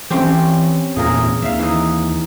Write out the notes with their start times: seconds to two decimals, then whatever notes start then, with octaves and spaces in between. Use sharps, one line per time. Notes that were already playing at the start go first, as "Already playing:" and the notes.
0.10 E3 C4 C#4 G4
0.96 G#1 E2 A#2 G#4 A#4
1.42 D#2 E5 F5
1.59 E3 D#4